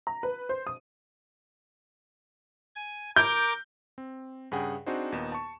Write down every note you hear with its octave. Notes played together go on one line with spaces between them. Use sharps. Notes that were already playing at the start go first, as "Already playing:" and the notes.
A#5
B4
C5
D#6
G#5
A#4 D6 G6
C4
G2 C#3 G#4 F#5 G5
C4 D4 D#4 F#4 G#4 C5
D#2 A#2 B3 D#4 E7
A5 C#6